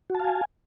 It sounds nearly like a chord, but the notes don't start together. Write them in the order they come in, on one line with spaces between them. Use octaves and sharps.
F#4 A5 F5 G#5